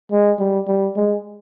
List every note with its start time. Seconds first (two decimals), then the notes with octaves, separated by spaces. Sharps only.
0.11 G#3
0.39 G3
0.68 G3
0.96 G#3